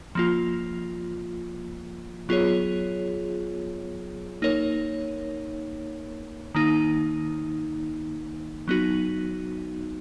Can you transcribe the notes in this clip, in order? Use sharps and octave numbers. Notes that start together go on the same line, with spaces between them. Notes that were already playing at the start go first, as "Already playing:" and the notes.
F3 A#3 F4
F#3 B3 F4 G#4 C#5
A#3 D#4 A#4 C#5
D#3 A#3 D#4
F#3 B3 D#4 F#4